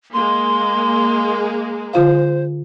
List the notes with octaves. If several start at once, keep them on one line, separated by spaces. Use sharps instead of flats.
G#3 A#3 C6
D3 F4 C5 F5